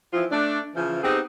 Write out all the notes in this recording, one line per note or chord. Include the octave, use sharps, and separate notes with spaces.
E3 F3 C4 E4 F4
A3 D4
C#3 E3 F3
B3 C4 D#4 G4 G#4